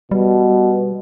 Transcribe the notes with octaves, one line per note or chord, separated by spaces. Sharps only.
B2 G3